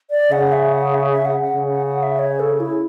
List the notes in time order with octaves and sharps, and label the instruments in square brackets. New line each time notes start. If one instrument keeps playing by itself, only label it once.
[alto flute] D5
[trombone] C#3 [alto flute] F#5
[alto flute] E5
F#5
E5
E5
F#5
F#5
[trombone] C#3
[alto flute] F#5
F#5
E5
C#5
A4
E4